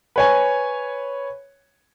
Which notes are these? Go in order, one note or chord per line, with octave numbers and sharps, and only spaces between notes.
B4 C#5 G#5